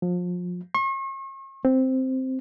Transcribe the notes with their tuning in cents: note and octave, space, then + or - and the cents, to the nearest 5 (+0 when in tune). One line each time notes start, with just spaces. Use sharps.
F3 +30
C#6 -45
C4 +0